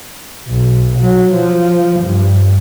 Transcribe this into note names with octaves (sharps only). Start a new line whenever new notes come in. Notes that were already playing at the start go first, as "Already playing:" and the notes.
B1
F#3
F3
G2